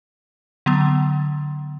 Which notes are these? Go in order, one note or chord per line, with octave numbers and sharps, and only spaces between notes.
D3 F#3 B3